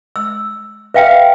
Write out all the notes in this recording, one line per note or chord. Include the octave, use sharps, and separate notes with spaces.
E6
B4 E5 F5 G5